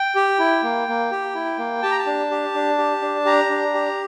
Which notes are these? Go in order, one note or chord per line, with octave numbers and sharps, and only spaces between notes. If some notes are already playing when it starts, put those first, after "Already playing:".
Already playing: G5
G4
E4
A#3
A#3
G4
E4
A#3
G4 A5
A#5
A5
D4
G4
D4
G4
D4
G4 A#5
D4
G4